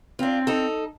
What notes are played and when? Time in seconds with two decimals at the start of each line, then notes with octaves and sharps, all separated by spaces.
0.19 C4 D4 F4
0.47 D#4 A4